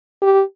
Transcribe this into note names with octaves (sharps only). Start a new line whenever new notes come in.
G4